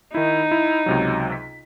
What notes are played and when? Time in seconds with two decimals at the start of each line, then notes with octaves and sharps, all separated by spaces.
0.15 D#3 D#4 E4
0.51 E4
0.86 C#2 C3 F#3
1.32 B6